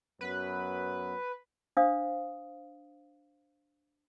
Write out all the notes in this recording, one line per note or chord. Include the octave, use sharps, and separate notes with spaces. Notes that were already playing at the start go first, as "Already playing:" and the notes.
F#2 F#3 B3 B4
D4 C5 F5 D#6